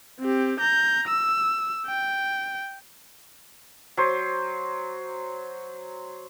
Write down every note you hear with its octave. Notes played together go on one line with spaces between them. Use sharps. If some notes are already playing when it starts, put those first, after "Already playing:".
C4 G4
A#5 G6
E6
G5
F#3 C5